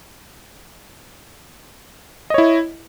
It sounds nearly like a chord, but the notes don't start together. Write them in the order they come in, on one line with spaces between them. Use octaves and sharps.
D#5 C#5 E4